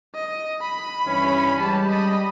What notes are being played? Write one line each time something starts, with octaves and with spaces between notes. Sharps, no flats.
D#5
B5
G2 E3 C#4
G3 G#3 G4 A5
D#5 B5